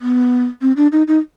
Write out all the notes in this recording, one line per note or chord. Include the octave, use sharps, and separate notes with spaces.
B3
C4
D4
D#4
D#4